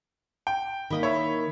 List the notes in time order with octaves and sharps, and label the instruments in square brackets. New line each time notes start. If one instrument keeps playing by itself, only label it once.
[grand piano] G5
[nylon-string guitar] D#3 A#3 [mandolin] E4 D#5 B5
[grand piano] C#5 E5